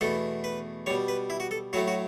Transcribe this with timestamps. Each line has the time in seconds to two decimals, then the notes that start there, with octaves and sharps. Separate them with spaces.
0.01 E2 B2 A3 A4
0.44 B4
0.86 B2 G3 C#5
1.08 B4
1.30 E4
1.40 F#4
1.51 A4
1.73 A2 F#3 A3 F#4
1.88 F#4